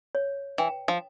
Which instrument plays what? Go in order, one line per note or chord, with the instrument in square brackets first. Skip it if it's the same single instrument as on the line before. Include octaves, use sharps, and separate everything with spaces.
[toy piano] C#5
[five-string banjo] E3 [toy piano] G5
[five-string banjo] F3